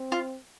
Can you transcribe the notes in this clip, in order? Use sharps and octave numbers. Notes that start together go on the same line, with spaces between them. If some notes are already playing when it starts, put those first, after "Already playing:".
Already playing: C4
F4